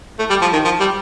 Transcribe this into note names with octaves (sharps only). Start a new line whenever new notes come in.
A3
G3
F3
D#3
F3
G3